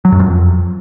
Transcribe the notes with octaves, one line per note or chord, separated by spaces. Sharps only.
F#3
F#2
F2